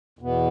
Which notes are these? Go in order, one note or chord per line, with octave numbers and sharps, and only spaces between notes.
E2 B2 B3